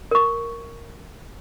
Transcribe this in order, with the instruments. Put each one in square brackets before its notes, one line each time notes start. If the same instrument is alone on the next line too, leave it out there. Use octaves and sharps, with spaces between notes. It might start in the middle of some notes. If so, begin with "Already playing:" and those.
[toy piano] A#4 C#6